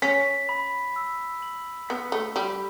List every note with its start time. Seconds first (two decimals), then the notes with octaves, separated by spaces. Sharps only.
0.02 C#4 B6
0.49 B5
0.96 E6
1.42 F#7
1.89 B3 B6
2.12 A3
2.36 G3 B5